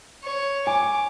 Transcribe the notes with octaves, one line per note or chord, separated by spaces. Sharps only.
C#5
G#5 D6